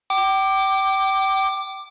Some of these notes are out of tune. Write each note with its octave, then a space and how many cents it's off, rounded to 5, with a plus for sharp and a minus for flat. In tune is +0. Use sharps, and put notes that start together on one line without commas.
G5 -30 D6 +15